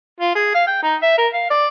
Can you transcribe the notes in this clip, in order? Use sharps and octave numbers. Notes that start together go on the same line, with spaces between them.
F4
G#4
F5
G5
D#4
E5
A#4
F5
D5